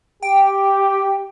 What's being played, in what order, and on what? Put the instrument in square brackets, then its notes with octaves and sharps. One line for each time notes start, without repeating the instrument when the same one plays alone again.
[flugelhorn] G4 [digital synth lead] G5